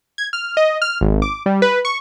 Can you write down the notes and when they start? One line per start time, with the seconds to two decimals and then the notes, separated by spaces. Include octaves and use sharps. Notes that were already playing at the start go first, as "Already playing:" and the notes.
0.18 G#6
0.33 F6
0.57 D#5
0.82 F6
1.01 G#1
1.22 D6
1.46 G3
1.62 B4
1.85 C#6